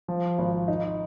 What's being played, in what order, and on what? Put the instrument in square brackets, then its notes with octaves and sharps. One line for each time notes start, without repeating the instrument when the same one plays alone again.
[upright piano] F3
G#1
D#4